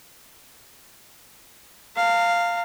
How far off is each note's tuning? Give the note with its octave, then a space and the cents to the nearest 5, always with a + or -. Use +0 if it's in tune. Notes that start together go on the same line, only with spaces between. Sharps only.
F5 +0 A#5 -40